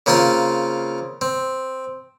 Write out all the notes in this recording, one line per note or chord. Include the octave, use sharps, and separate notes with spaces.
C#3 A#3 C4 F4 C6
C4